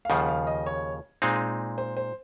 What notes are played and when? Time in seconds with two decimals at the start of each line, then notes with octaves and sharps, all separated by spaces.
0.05 F5
0.10 D#2 C#3 F3 F#5
0.29 F5
0.47 D#5
0.66 C#5
1.22 A#2 G#3 C4 D#4
1.78 C5
1.97 C5